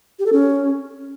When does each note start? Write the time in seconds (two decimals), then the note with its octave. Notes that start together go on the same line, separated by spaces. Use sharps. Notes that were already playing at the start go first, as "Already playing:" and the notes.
0.19 G4
0.26 A4
0.33 C#4